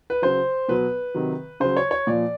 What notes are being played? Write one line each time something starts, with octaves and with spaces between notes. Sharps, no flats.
B4
C#3 F#3 C5
B2 F#3 B4
C3 D#3 F#3
C#3 F#3 C5
C#5
C#5
A#2 F3 D5